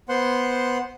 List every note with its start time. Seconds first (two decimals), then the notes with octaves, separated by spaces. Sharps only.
0.09 B3 C5 F#5 C6